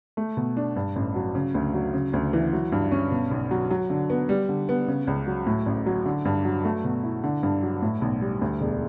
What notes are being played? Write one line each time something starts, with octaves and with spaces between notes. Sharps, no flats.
A3
B2
D4
G2
A1
F#3
C#3
D2
F#3
C#3
D2
E3
F#3
G2
C#4
B2
B1
F#3
F#3
D3
B3
G3
D3
B3
C#3
C#2
F#3
A2
A1
F#3
D3
G2
F#3
A3
B2
E4
D3
G2
F#3
A2
B1
G3
D2
E1